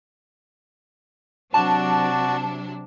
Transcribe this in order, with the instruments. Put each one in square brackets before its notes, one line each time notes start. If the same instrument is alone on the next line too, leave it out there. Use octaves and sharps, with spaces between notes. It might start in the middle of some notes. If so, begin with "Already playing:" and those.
[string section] C3 F#3 D4 [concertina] F#4 D5 [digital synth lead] A5